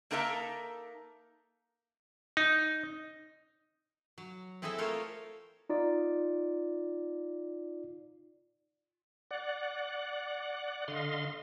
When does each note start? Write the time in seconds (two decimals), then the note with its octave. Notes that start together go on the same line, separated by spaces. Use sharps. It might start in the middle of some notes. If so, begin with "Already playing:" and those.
0.11 A#3 D#4 A4 A#4 E5 A#5
2.37 D#4
4.18 F#3
4.62 C4 E4 G#4 A4 D#5 E5
4.78 A3 A#3 F4 A#4 C5 C#5
5.70 D#4 F4 D5
9.31 D5 F#5
10.88 D3 D#5 F5 C6